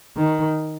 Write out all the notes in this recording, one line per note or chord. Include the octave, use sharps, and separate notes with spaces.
D#3